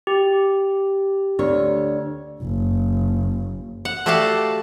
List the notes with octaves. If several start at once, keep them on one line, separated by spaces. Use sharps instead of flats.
G4
D2 C#5
F#1
F#5
A3 F#4 G4 D5 F5 A5